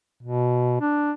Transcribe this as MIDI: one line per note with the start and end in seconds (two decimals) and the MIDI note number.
0.23 0.77 47
0.81 1.12 62